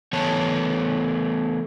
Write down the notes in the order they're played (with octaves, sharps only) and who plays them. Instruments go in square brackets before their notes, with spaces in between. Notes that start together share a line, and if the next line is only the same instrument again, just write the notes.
[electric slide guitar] E3 A3 B3 C#5 A5